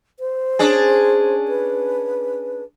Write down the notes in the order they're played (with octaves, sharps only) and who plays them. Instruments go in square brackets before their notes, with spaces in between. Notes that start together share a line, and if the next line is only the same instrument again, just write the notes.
[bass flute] C5
[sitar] C#4 D4 G#4
[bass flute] B4